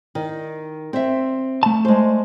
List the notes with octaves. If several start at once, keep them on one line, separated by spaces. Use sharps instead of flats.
D#3
C4 E5
A3 A5
G#3 C5